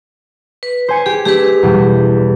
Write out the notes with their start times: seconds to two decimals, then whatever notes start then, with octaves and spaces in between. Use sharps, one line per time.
0.63 B4
0.88 C5 G#5 C#7
1.06 G4 G#4
1.25 A3 D4 G4 G#4 B4
1.63 E2 B2 G3